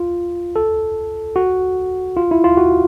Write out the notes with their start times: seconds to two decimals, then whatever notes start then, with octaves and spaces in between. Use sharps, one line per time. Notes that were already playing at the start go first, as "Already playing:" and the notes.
Already playing: F4
0.56 A4
1.36 F#4
2.17 F4
2.31 E4
2.44 F4
2.57 F#4